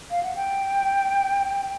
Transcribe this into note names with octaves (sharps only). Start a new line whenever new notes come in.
F5
F#5
G5